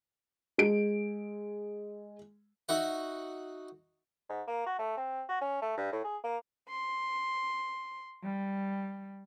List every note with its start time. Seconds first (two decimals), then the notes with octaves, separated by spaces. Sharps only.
0.58 G#3 D7
2.69 D#4 F#4 E5 F#5
4.29 G#2
4.47 A#3
4.66 F#4
4.79 A3
4.97 C4
5.29 F#4
5.41 C#4
5.62 A3
5.77 G2
5.92 A2
6.04 G#4
6.24 A#3
6.69 C6
8.24 G3